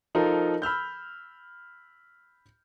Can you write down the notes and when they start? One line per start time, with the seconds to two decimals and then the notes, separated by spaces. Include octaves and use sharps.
0.15 F3 D#4 F4 A4 A#4
0.62 B5 E6 F6 G6